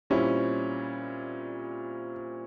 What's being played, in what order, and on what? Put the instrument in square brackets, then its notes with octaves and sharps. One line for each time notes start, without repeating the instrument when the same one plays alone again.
[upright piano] A#2 G3 C4 E4 [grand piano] C#4